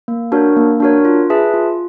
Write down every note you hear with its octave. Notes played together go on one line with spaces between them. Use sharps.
A#3
D4 F#4 A#4 C#5
A#3
D4 F#4 A#4 C#5
F4
G#4 B4 E5 A5
F4